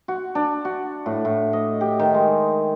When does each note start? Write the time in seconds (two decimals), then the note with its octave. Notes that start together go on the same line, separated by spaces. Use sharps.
0.08 F#4
0.35 D4
0.65 F#4
1.06 A2
1.25 A2
1.53 D#5
1.81 G4
1.99 D#3
2.14 G#3